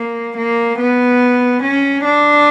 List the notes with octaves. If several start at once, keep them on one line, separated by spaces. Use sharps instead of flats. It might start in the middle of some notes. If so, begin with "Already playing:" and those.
Already playing: A#3
A#3
B3
C#4
D4